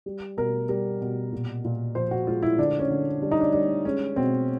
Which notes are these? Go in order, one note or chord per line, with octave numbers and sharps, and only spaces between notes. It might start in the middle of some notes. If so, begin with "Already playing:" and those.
G3
B2 A#4
G3 A#4
B2
A#2
A#2
F3 C5
F#4
G#3 F4
E4
D3 D4
C#4
D3
G3 D4
D#4
D4
G3 D4
G#3 C#4
B2 C4